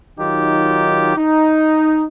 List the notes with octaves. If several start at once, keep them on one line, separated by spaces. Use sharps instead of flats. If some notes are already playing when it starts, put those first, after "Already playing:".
D#3 F#3 D#4 F4 G4
D#4